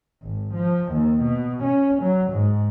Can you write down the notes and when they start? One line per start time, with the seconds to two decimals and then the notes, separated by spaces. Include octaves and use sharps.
0.22 G#1
0.54 F3
0.93 D#2
1.22 B2
1.63 C#4
2.02 F#3
2.32 G#2